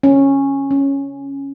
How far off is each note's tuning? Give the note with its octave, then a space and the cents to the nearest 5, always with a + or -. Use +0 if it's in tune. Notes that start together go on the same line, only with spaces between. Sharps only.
C#4 -10
C#4 +0